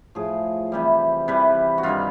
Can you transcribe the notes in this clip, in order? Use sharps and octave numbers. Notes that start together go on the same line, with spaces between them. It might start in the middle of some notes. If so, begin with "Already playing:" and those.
A2 F3 G#4
C3 E3 G3
C3 E3 G3 B4
F#4
G2 D#3 G3 F4